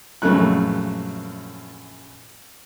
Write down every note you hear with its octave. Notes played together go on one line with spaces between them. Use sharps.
A#1 F#2 C#3 A3 F#6